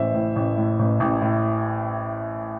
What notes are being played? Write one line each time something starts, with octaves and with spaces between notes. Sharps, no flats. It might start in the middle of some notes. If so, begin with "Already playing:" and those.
Already playing: A1 E3 C5 E5
A2
A1
A2
A1
A1
A2